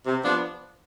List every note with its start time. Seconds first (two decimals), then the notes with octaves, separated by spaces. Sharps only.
0.05 C3
0.23 F3 B3 D4